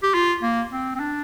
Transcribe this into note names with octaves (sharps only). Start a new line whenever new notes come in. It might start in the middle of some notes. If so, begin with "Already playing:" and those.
G4
F4
A#3
C4
C4
D4